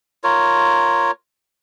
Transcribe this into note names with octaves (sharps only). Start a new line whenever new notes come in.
F4 A#4 C#5